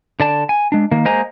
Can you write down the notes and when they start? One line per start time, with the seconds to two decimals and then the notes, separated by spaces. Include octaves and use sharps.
0.20 D3 D5 A5
0.49 G#5
0.72 G#3 D4
0.91 D#3 A#3
1.05 G#3 A#3 C5 D#5 G#5 A#5